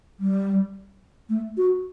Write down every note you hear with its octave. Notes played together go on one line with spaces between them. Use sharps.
G3
A3
F#4